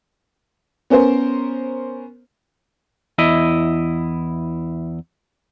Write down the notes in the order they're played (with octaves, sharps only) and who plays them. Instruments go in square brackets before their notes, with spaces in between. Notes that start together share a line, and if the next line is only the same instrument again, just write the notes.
[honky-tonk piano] B3 C#4 A#4 C5
[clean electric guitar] E2 E4 D#5